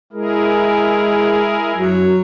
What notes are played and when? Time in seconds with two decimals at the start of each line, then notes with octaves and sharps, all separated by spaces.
0.13 G#3 E4 G#4 A#4
1.75 F#2 F#3